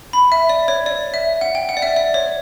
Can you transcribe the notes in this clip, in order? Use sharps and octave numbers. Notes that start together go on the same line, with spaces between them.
B5
E5
D5
C#5
D5
E5
F#5
G5
F#5
D5
E5
D5
C#5